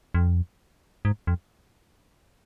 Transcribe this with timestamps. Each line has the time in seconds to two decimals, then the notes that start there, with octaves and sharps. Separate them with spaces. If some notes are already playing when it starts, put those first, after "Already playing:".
0.14 F2
1.05 G#2
1.27 F2